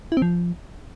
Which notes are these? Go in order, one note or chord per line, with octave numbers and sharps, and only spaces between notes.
E4
C4
F3